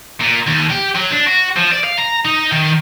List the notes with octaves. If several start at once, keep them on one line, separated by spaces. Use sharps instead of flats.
A#2
D#2
G4
F#3
D4
F#4
F3
D5
F5
A#5
D#4
D#3